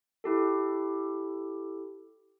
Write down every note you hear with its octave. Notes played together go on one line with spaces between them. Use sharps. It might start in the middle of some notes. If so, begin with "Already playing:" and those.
E4 G4 A4